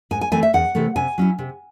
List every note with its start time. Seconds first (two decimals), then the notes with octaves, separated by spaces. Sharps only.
0.11 G#2 G#5
0.21 G#5
0.32 E3 A3 C4 G#5
0.43 E5
0.53 E2 F#5
0.75 C3 E3 A3
0.96 C3 G#5
1.18 F#3 C#4 E4
1.39 C3